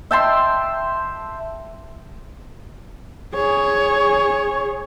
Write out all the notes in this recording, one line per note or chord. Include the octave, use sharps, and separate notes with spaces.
E5 G5 A5 C6
G#4 C#5